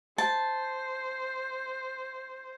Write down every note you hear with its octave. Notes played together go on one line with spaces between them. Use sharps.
C5 A5